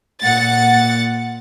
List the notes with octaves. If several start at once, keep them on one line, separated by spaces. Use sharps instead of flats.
A#2 F#5 A6